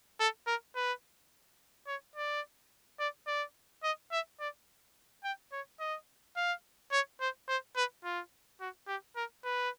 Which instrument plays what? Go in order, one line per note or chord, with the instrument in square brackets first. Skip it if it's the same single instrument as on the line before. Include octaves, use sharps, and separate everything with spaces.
[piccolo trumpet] A4
A#4
B4
C#5
D5
D5
D5
D#5
E5
D5
G5
C#5
D#5
F5
C#5
C5
C5
B4
F4
F#4
G4
A#4
B4